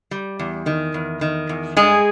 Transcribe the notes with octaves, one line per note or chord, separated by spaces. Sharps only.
G3
E2
D#3
E2
D#3
E2
G2 G#3 G#4